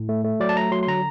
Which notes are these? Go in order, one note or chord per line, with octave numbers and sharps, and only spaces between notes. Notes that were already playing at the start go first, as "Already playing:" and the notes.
Already playing: A2
A3
A3
F#3 D5
A5
A3 A#5
F#3 C6
C6
D3 A#5